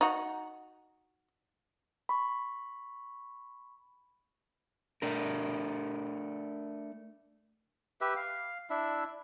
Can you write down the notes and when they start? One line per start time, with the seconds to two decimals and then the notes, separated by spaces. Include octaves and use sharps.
0.01 D#4 F#4
2.09 B5 C#6
5.02 A3 D4 A#4
8.01 G4 B4 E5
8.16 F5
8.70 D4 E4 E5